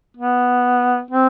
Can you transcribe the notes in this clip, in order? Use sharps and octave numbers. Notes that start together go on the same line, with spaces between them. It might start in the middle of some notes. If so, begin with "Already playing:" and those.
B3
C4